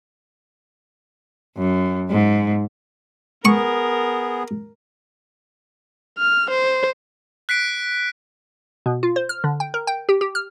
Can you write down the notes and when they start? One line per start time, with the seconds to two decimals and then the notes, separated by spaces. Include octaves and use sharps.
1.57 F#2
2.09 G#2
3.45 B3 G#4 A#4 C#6
6.18 F6
6.51 C5
7.49 F#6 B6 C7 D7
8.86 B2
9.03 F4
9.16 C5
9.29 F6
9.44 D3
9.60 G5
9.74 A#4
9.87 G5
10.09 G4
10.21 G4
10.35 F6